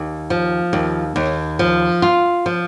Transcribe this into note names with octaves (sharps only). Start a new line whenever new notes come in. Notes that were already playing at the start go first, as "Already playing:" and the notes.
Already playing: D#2
F3
D#2
D#2
F3
F4
F3